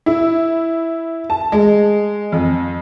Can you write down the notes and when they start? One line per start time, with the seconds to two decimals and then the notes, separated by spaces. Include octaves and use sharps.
0.06 E4
1.30 A5
1.52 G#3
2.32 F2